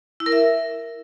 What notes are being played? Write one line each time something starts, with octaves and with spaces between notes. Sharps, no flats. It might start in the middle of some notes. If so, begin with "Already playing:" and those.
E4
A#4
E5